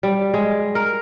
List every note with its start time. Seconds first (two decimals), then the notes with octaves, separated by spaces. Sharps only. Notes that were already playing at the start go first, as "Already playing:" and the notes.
0.03 G3
0.34 G#3
0.75 A#4